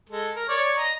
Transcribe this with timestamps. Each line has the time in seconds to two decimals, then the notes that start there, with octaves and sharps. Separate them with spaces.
0.09 G#3 A4
0.35 A#4
0.49 C#5 D5
0.77 D#5 A#5